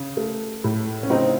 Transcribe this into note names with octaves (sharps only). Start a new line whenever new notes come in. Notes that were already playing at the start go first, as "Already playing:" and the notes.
Already playing: C#3
A3
A2
C#4
C#3 C4 D#4